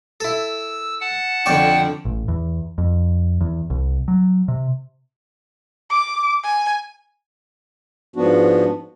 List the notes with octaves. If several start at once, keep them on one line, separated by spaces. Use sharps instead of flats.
E4 A4 E6
F#5 A5
F2 D3 F3 C#5 D5 G5 C#6
A1
E2
F2
E2
C2
F#3
C3
D6
G#5
G#2 F3 B3 D4 F#4